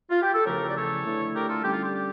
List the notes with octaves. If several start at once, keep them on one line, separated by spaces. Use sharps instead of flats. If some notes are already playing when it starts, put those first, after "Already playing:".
F4
G4
A4
E2 C#3 F3 A3 C#4 G4 A#4
D5
A4 C#5
D3 A3 E4
G4 A#4
F4 A4
D3 G3 C#4 G4
F4
G4
G4